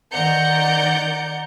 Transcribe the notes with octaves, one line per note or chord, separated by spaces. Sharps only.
D#3 D5 F#5 A#5 G6 C#7